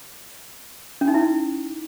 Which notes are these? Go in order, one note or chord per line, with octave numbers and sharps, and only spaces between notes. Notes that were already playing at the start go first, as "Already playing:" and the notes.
C#4
D#4
E4